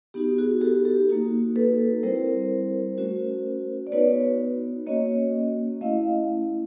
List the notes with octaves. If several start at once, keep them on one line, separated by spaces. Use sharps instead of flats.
B3 D#4 F#4 G4
F#4 G#4
G4 A4
G4 A4
A#3 D#4 F#4
A4 B4
G3 C4 E4 A#4 C5
A3 C#4 F#4
D5
B3 D#4 F#4 B4 C#5
A#3 C#4 F#4 C#5 D#5
A3 C#4 E4 D#5 F5